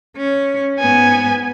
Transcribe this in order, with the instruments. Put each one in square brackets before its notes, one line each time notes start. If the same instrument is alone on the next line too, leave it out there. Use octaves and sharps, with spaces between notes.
[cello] C#4
[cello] G#2 B3 [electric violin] G#5